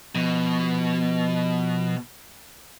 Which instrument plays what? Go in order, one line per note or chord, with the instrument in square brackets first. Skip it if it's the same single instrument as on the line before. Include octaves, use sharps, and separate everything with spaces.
[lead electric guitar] B2 [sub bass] F3